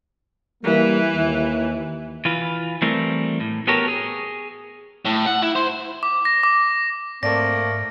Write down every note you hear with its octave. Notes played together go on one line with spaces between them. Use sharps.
E3 G3 A#3
D#2
E3 F4 B4
E3 G3 A3 C4 A#4
A2
B3 F#4 G4 A4 A#4 C#5
G#4
A2
F#5
E4
C5
D6
A#6
D6
G#2 A3 A#3 C4 D5 A#6